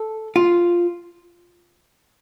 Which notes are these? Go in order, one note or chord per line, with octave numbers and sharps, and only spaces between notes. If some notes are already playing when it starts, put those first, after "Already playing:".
Already playing: A4
F4